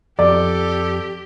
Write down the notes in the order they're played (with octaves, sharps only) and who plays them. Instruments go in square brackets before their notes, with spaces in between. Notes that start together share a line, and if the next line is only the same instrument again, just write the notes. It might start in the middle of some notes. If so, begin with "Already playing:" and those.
[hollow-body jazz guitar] F2 [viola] G4 [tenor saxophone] A4 [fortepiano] D5